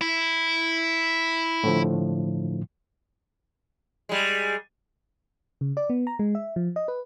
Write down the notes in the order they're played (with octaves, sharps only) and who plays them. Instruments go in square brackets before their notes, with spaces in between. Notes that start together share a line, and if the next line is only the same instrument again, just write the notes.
[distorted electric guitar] E4
[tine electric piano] A2 D3 F3
[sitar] G3 G#3
[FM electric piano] C#3
D5
B3
A#5
G#3
E5
F3
D#5
B4